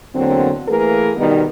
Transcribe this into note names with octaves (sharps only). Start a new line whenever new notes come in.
E2 D3 F#3 A#3 C4
E3 A3 A#3 G#4 A#4 B4
B2 D#3 G3 B3 D#4